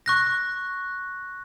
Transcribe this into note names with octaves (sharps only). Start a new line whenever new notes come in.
C#6 F#6 A#6